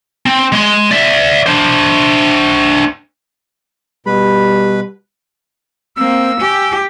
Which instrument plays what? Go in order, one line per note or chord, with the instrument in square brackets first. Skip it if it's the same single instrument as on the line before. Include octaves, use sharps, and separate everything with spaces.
[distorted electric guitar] C4
G#3 C6
D5 E5
D4 C5
[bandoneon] B2 B4 B5 [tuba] G3
[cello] A#3 [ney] C4 [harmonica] E6
[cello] G4 [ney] G#5